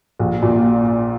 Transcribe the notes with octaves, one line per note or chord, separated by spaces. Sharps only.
A#1
A#2